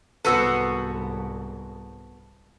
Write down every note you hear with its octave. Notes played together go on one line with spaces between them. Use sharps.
C2 G#2 B3 F#4 A4 B4 C5 E6